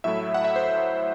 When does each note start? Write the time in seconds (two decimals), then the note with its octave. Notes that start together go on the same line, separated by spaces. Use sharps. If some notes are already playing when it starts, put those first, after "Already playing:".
0.04 A2 F#3 A3 E4 E5
0.34 F#5
0.44 E5
0.56 C5